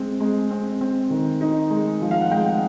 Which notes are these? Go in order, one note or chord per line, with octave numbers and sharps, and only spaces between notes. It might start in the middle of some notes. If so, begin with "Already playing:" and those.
Already playing: G#3 C4
G#3
C4
C4
D#3
D#4
G#3
F3
F5
F#5
G#3 G5